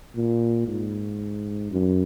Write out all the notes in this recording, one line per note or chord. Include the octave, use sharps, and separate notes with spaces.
A#2
G#2
F#2